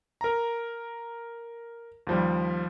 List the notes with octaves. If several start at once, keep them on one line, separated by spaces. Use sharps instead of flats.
A#4 A#5
D#2 F3 G3